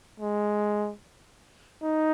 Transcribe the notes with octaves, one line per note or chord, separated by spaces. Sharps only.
G#3
D#4